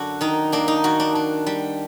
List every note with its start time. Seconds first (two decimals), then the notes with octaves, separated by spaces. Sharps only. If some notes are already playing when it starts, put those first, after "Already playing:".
Already playing: F#2 D3 D4 F#4 A4
0.21 D#3 D#4
0.52 A#3 D4
0.68 D#4
0.84 D#3 F#4
1.00 D4
1.15 D4
1.47 G3